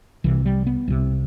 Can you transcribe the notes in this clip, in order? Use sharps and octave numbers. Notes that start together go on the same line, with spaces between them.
C2 C3 E3
G3
B3
C2 C3